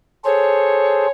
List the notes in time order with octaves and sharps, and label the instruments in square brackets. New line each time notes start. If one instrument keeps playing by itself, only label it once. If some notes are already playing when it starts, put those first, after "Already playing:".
[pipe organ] G#4 A4 C5 [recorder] C#5